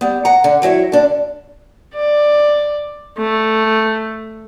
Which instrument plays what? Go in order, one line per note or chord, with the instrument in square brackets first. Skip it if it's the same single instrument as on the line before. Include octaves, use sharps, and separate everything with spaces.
[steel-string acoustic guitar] G3 B3
F#5 A#5
D3
E3 F#3 E4 C#5
D3 D4
[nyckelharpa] D5
A3